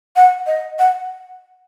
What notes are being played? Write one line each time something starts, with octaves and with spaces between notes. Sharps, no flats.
F#5
D#5
F#5